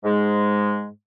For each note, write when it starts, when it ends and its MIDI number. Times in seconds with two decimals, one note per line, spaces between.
0.04 0.88 44
0.04 0.88 56